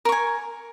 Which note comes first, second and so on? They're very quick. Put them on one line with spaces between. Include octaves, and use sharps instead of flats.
A#4 C#6 G#5